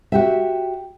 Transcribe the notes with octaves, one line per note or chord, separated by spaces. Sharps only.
F#4 G4 E5